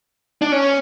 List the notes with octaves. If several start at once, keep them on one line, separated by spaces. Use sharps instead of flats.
D4
C#4